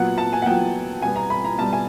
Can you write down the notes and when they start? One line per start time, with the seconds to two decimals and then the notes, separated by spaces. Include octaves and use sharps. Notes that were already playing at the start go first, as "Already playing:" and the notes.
Already playing: A#2 F#3 B3 F#5
0.18 A5
0.33 G#5
0.42 F#5
0.46 A#2 F#3 B3 G5
1.02 B2 G3 B3 G#5
1.16 A#5
1.30 B5
1.44 A#5
1.58 B2 G3 B3 A5
1.73 G#5